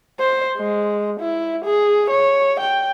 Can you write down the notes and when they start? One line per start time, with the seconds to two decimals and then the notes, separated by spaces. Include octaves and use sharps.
0.20 C5
0.58 G#3
1.20 E4
1.65 G#4
2.10 C#5
2.60 G5